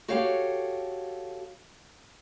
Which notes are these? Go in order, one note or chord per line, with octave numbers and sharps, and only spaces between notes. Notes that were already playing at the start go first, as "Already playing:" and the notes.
F#4 G4 A4 C#5 F5